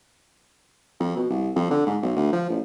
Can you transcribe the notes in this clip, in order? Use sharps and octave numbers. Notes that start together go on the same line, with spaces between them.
F2
B2
C2
F2
D3
G#2
B1
D2
F3
A1